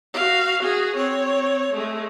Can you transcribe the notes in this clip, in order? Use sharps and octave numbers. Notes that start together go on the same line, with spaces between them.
F#4 F5
F#4 G#4
C4 C#5
G#3 A3